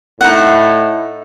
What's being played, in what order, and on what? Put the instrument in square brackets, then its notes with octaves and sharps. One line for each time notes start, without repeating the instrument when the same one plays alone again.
[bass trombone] A2 [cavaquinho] D#4 E5 F#5